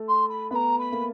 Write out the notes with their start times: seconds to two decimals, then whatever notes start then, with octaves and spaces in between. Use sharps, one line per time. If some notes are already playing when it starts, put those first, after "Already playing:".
Already playing: A3
0.08 C6
0.29 B5
0.50 B3 A#5 B5
0.79 B5
0.92 A#3